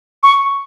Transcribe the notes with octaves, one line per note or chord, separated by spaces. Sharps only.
C#6